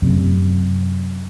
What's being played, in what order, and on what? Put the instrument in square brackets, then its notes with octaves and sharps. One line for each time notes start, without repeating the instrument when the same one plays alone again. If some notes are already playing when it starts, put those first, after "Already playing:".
[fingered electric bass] F#2 C3